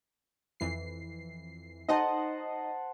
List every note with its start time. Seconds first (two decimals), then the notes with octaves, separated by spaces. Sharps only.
0.60 F2 E3 C7
1.88 D#4 C5 D#5 F#5 A5